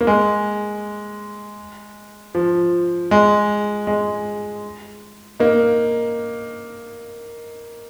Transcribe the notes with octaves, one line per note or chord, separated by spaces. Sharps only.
A#3
G#3
F3
G#3
G#3
A#3 D#4